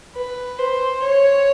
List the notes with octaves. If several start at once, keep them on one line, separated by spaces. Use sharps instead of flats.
B4
C5
C#5